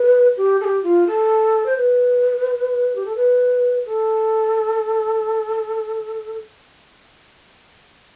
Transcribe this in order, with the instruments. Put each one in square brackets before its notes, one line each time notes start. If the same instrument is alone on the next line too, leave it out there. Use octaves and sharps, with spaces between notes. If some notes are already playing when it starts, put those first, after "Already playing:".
Already playing: [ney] B4
G4
A4
G4
F4
A4
C5
B4
G4
A4
B4
A4